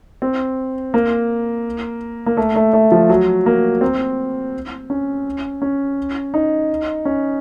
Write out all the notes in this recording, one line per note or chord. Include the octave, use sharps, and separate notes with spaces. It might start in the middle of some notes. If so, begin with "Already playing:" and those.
C4
A#3
A#3
A3
A3
A3
F3
F#3
A#3
C4
C#4
C#4
D#4
C#4